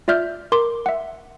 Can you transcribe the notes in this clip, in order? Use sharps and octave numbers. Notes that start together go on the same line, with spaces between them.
F4 D5 E5 F6 G6
A#4 C6 D6
E5 F#5